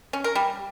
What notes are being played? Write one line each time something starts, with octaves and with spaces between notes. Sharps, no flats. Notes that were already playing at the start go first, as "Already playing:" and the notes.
C#4
A#4
G3